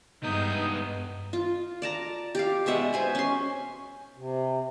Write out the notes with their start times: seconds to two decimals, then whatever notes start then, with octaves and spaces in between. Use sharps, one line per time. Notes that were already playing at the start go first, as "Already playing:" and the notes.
0.23 G2 G#3 B3 D#4 D#6 G6
1.33 F4
1.82 D5 A5 A#5
2.35 G4 D5 F5
2.66 B2 G#3 E5 F#5
2.93 C5 G#5 B5
3.15 C#4 C6
4.16 C3